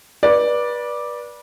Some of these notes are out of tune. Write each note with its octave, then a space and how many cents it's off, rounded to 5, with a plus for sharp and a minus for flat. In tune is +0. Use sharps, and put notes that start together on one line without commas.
B4 -30 D5 +0